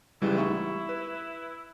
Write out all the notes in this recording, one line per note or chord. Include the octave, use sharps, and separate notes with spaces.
C#2 E3 G3 G#3 E4
A3 B3 D#4 C#6
B4